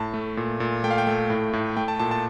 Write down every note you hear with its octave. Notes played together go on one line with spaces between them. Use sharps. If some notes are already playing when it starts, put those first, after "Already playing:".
Already playing: A2 A5
A3
A#2
A#2
A3 G5
F5
G5
A3
A2
A2
A3 G5
A5
A#2 A5
A5